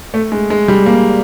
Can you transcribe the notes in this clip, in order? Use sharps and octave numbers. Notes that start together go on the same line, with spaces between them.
A3
G#3
G#3
G3
A#3